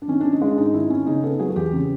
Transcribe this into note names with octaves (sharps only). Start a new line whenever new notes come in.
D4
D#3 C#4
C#4 D4
D#4
G#3 D4
G#2 D#4
D#3 E4
C#4
C#3 D#4
B3 A4
F#3 G#4
G#4
E2 G4
C#3